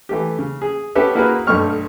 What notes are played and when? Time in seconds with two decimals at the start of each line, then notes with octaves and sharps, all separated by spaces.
0.09 E3 A3 G4
0.39 C#3
0.62 G#4
0.95 B3 C#4 G4 A4 B4 E5
1.15 A#3 E4 F#4 G#4 A#4 B4
1.47 B1 G2 A3 D#5 C#6 F6